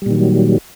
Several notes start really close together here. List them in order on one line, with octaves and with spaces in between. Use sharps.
G3 A#2 D#3 F#3